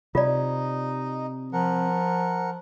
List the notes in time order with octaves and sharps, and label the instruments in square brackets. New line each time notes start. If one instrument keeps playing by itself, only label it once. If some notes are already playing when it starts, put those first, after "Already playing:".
[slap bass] C3 [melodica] D#4 D#5 [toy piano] F4 D5
[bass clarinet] F3 [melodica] A#4 F#5